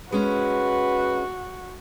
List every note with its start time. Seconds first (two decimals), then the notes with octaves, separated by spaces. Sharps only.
0.12 G#3 C#4 F#4 B4